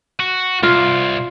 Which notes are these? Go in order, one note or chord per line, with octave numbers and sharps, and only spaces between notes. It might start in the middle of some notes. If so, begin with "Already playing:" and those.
F#4
C2 F4